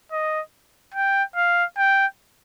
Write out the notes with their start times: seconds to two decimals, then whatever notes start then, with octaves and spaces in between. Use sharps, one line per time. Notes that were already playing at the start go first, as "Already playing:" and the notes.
0.12 D#5
0.94 G5
1.36 F5
1.77 G5